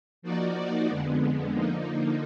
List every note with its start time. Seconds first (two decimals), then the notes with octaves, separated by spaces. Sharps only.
0.22 F3 A#3 D#4 F#4 D5
0.86 F2 D3 G#3 B3
1.50 D3 F3 A#3 D#4